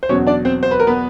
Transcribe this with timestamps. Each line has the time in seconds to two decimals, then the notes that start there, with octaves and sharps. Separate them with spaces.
0.03 C5
0.09 E2 B2 F#3 C#4 C#5
0.27 D4 D5
0.45 C4 C5
0.63 C5
0.71 B4
0.80 A#4
0.87 B3 B4